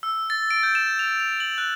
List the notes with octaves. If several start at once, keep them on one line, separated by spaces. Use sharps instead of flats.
E6
A6
D7
G6
E7
F7
F7
F#7
F#6